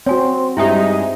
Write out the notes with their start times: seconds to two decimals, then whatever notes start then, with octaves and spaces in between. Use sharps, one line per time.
0.07 C4 F#4 C#5 G#5 C6
0.57 G2 G#3 D#4 E4 G4 E5